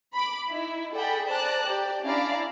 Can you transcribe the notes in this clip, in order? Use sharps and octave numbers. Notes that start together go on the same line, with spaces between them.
B5 D6
D#4 E4
G#4 A4 D5 F#5 G5 B5
C5 D5 A5 A#5 F#6
G4 D5
C#4 D4 E4 D5 F5 A#5